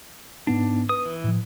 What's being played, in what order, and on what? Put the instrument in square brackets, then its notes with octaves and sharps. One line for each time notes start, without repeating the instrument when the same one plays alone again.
[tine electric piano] G#2 B3 D#4 [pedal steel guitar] D4
[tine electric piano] B4 [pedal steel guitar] D#6
[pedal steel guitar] E3
[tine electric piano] A2 F3